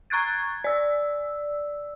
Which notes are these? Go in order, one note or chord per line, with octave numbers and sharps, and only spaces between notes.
A#5 C#6 F#6 G#6 A6
D5 E6